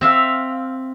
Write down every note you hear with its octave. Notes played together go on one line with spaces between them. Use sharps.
C4 E5 F5